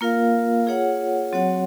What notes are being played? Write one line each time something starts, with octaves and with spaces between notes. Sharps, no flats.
A#3 F4 A#4 F5
F4 G#4 C#5 F#5
F#3 C4 F#4 C#5 F#5